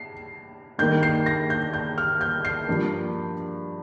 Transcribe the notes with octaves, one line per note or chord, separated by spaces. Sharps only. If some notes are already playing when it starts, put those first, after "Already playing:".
Already playing: C7
G2 D#3 A#3 G6
C7
A#6
G6
G6
F6
G6
C7
G2 F3 A#3